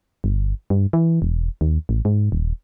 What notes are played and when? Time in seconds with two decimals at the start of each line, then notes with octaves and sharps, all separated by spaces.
0.24 G1
0.70 G2
0.93 E3
1.22 E1
1.61 D#2
1.89 A1
2.05 G#2
2.32 D#1